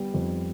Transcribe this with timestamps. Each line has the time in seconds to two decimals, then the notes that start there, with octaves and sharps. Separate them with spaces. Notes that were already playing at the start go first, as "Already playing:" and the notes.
Already playing: G3 B3
0.14 F2